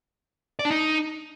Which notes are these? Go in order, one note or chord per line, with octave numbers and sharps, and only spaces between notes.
D5
D4
D#4